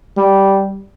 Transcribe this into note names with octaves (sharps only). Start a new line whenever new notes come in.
G3